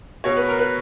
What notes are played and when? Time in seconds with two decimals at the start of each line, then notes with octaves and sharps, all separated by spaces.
0.24 B2 C#5
0.37 B4
0.48 A#4
0.59 B4